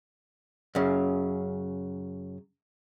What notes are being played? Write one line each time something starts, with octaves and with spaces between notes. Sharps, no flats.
F#2 C#3